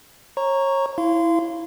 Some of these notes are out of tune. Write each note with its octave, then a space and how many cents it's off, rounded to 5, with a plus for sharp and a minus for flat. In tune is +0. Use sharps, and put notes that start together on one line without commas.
C#5 -30 A#5 +0 C#6 +0
E4 +0 F5 -25 C6 -20